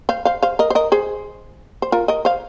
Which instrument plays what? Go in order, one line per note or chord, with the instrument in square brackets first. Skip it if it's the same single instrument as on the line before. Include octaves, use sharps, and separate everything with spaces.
[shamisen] C5 F5
C5 F5
C5 F5
A#4 D#5
C5
A#4 D#5
G#4 C5
C5
F4 A#4
A#4 D#5
C5 F5